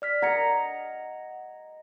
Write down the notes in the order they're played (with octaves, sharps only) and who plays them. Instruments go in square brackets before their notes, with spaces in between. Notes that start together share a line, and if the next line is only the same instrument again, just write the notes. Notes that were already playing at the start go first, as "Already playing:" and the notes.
[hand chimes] D5 F6 B6
[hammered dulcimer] D#5 A#5 [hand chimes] F#5 G#6 C#7